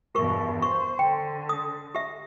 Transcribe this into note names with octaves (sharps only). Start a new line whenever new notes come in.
E2 G2 B2 G4 A#4 C#6
C5 C#6
D3 G5
D#6
G4 E5